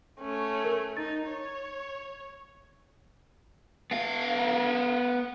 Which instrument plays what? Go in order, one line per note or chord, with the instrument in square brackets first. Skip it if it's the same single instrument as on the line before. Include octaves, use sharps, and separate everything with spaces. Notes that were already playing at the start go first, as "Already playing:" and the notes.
[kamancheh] A3 C#4
[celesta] A#4
[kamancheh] D#4 [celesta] A6
[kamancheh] C#5
[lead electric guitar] B3 F5